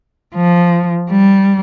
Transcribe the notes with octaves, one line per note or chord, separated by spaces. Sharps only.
F3
G3